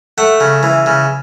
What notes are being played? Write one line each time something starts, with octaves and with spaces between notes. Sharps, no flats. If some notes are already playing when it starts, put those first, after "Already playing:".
A3 F#5
C#3
E3
C#3